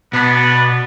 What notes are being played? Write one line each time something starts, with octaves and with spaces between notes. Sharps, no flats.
B2 B3 D4 B4